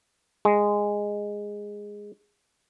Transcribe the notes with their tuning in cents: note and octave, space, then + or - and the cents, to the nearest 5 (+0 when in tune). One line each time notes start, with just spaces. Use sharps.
G#3 -10